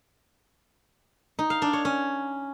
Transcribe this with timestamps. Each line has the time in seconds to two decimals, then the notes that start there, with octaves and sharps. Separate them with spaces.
1.39 D#4
1.50 F5
1.62 D4
1.73 C#5
1.85 C#4